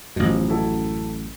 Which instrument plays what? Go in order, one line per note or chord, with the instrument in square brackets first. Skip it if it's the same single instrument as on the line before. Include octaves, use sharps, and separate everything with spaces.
[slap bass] A1 F#2 [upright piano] B2 D#3 F3
[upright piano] E4 F#4 A4